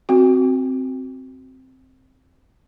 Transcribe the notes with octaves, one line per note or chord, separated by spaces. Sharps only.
C4 F#4